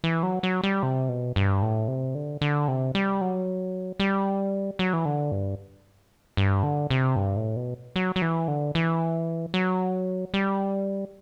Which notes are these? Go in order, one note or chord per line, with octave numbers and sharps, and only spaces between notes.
E3
F#3
F#3
G3
C3
B2
G2
A2
C3
D3
D3
C3
G3
F#3
G3
F#3
E3
D3
G2
G2
D3
C3
G2
A2
B2
F#3
F#3
E3
D3
E3
F#3
G3